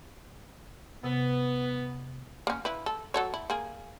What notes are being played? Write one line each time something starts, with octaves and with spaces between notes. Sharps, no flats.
C3 B3
A#3 C#4
E4 B4
A4
F#3 A4 C#5
E4
A#3 G#4